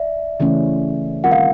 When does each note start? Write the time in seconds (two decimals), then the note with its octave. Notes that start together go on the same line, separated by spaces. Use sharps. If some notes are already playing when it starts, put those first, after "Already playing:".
Already playing: D5 E5
0.40 C#3 E3 A3 C#4
1.24 D#3 G3 C4 F4 A#4 F#5
1.32 F5